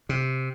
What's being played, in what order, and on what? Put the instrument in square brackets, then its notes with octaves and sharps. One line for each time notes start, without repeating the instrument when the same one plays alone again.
[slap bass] C3